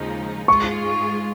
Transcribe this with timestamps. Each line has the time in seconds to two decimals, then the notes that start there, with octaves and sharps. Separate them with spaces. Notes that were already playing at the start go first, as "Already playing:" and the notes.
Already playing: D#2 C#3 F3 G#3 D#4
0.48 G#2 G#3 F4 G#4 C#6